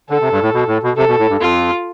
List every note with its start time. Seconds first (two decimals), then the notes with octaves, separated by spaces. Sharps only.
0.10 D3 A4
0.21 C3
0.32 G2
0.42 A2
0.54 B2
0.68 A2
0.83 B2
0.97 C3 A4
1.08 B2
1.19 A2
1.29 G2
1.40 F2 F4